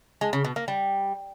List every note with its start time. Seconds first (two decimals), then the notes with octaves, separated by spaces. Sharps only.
0.21 G#3
0.33 C#3
0.45 B2
0.56 A#3
0.68 G3